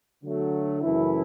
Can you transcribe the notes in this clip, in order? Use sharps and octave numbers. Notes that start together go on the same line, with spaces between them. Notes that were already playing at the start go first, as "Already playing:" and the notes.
D3 F#3 A3
F#2 C#3 E3 A3 E4